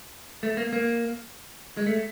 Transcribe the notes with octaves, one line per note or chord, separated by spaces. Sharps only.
A3
A#3
A#3
G#3
A3